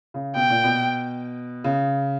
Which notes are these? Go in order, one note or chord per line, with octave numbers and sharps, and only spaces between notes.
C#3
B2 G5
A#2
B2
C#3